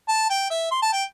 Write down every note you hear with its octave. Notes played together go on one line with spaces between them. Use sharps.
A5
G5
E5
C6
A5
G5